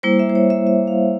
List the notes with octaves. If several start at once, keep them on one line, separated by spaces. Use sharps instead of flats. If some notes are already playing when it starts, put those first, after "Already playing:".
G3 A#3 E4 C5
E5
C5
C#5
E5
E5
F5